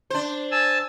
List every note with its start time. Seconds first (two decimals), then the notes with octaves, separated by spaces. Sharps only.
0.10 D4 C5
0.51 G#5 A5 E6